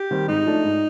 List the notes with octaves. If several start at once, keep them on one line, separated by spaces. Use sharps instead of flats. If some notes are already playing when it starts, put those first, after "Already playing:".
Already playing: G4
D#3 G3 C4
G#2 D#4
F3 A3 D4
G#2